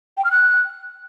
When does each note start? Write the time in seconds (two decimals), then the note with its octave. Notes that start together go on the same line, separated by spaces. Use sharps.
0.17 G5
0.24 F6
0.31 F#6